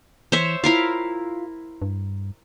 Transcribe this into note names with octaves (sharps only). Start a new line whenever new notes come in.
E3 C5 C#5 E5
E4 F4 A#4 F5
G2